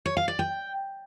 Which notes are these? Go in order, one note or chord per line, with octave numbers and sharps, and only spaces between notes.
C#5
F5
D5
G5